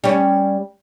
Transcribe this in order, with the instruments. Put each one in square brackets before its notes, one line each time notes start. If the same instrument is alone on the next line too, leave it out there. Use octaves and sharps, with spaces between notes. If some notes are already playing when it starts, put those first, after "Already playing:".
[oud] G3 C#4